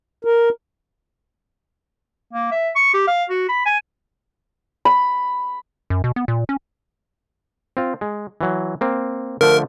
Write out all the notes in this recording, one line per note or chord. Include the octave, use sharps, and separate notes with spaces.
A#4
A#3
E5
C#6
G4
F5
F#4
B5
G#5
B5
F#2
B2
B3
A#2
C#4
C4 F4
G#3
E3 F#3
A#3 C4
D3 F3 A3 A#4